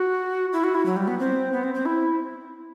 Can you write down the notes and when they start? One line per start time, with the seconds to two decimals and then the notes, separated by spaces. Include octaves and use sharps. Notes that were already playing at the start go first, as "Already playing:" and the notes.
Already playing: F#4
0.53 E4
0.64 F#4
0.75 E4
0.86 F#3
0.97 G3
1.08 B3
1.19 C4
1.53 B3
1.63 C4
1.75 C4
1.86 E4